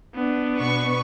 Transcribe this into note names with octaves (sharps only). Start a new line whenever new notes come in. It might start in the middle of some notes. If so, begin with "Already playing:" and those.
B3 D4
B2 B4 C#6